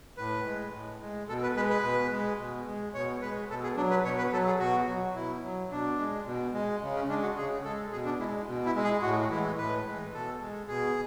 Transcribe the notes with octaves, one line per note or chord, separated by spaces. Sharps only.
A2 B4
G#3
A2
G#3
B2 A4
B4
G#3 B4
B4
B2
G#3
B2
G#3
B2 C#5
G#3 B4
B2 A4
G#4
F#3 D4
B4
B2 C#5
B4
F#3 A4
G#4
B2 F#4
F#3
B2 E4
F#3
B2 D4
G#3
B2
G#3
C#3
C#4
G#3 D4
F#4
C#3 G#4
G#3 A4
B2 G#4
D4
G#3 E4
B2
E4
G#3
G#4
A2 F#4
E3 G#3 E4
A2 B4
E3 G#3
B2 A4
G#3
B2 G#4